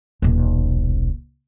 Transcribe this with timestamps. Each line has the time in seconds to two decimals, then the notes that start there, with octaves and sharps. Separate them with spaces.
0.22 D#1 B1